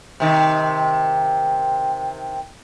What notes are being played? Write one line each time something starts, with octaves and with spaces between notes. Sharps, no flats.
C3 D#3